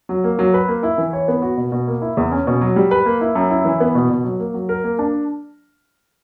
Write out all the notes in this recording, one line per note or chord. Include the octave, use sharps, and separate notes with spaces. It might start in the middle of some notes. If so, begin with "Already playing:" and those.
F#3
A#3
F#3
B4
A#3
E4
E3
C#5
B3
F#4
B2
B2
A#3
E4
E2
C#4
B2
F#3
G3
B4
A#3
E4
F#2
E4
E3
B3
B2
B2
F#3
A#3
F#3
A#4
A#3
D4